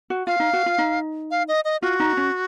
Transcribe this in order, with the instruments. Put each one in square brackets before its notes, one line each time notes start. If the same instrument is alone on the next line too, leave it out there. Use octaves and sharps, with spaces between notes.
[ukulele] F#4
[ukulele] F4 [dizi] F5
[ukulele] D#4
F#4
F4
D#4
[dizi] F5
D#5
D#5
[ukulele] F4 [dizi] F#4
[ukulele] D#4
C#4